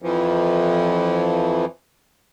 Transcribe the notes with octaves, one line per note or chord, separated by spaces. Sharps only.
F2 E3 F3